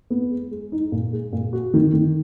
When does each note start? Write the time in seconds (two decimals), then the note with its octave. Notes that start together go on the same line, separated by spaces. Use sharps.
0.10 B3
0.31 G#3
0.51 G#3
0.72 D#4
0.92 A#2
1.12 G#3
1.33 A#2
1.53 F#4
1.74 D#3
1.93 D#3